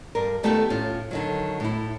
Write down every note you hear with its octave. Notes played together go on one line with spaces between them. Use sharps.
G2 A#4
D#3 A3 B3 F4 G4 A4
A2 C#4 F4
D3 D#3 F#3
A2 E4